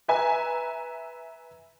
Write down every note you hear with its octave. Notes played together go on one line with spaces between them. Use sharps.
B4 E5 G#5 A#5